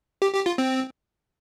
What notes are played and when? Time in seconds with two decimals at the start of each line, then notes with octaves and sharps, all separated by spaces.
0.22 G4
0.34 G4
0.46 F4
0.58 C4